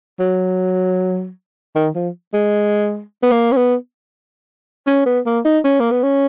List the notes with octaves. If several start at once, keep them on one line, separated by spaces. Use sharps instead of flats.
F#3
D#3
F3
G#3
B3
A#3
C#4
B3
C#4
B3
A#3
D#4
C#4
A#3
B3
C#4